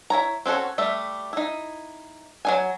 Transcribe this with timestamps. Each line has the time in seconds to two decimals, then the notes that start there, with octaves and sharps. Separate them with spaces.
0.10 E4 C#5 A#5
0.46 C4 C#4 F#4 A4
0.78 G3 A3 E5
1.33 D#4 E4
2.45 F#3 D#4 G#5